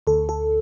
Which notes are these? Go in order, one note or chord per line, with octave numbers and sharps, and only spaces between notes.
D2 A4
A4